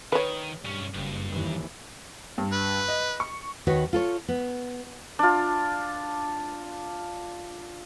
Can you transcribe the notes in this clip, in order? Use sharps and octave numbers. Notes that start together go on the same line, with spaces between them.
D#3 B4 C#5
B1 G2 C#4
F#1 G2
D#2 E3
G2
B4
D#5
C#6
D#2 D#3 F#4 B4 C#5
F4 A4 C#5
B3
D4 F4